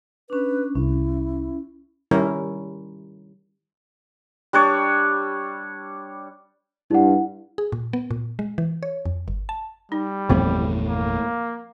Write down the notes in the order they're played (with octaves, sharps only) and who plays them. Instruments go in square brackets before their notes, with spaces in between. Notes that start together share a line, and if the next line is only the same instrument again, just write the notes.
[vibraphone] C#4 D4 [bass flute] B4
[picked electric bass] C2 [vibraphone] C#4 [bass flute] E4
[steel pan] D#3 G3 C#4 E4 A#4 C#5
[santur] G3 D4 C#5
[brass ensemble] G2 [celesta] E4 F#5
[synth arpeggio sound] G#4
A#2
B3
A#2
G#3
E3
C#5
F2
G1
A5
[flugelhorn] G3 [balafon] D#4
[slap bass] G1 E2 B3 [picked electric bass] A#2 A3 [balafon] F3 C4
[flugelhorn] A#3